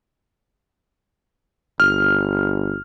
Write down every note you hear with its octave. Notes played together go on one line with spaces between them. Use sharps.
G1 F6